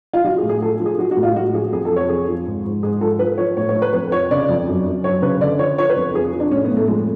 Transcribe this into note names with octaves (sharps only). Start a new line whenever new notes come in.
F4
F3 F#4
G#4
A2
G#4
F3 A4
F3
G#4
F3 F#4
F#4
A2
F4
A2 F#4
F3 G#4
F2 G#4
A4
F3
C#5
F2 G#4
F3
G#2
G#2
G#2 G#4
F3 A4
F3 B4
F3 C#5
A2 C#5
C#5
F3
B4
F2 B4
F3 C#5
C#3 D5
F2
F#2
F#2
F#2 C#5
C#3 B4
D3 D5
F3 C#5
F3 C#5
B4
F2
F3 G#4
F3
D4
A2 C#4
B3
A2
A3
F2 G#3